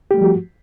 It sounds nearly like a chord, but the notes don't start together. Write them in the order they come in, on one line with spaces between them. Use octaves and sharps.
G4 A3 G3 F3 F#4